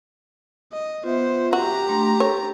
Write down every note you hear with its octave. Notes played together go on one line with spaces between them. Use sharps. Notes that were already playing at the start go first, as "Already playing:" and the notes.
D#5
B3 F4 C5 E5
F#4 G4 A#5
A3 D4 C6
A4 C#5